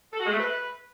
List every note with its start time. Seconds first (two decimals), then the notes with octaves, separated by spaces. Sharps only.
0.13 A4
0.19 F#4
0.26 G#3
0.33 A3
0.39 B4